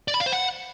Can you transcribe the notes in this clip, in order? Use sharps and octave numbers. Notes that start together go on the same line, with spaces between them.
D5
B5
F5
C5
F#5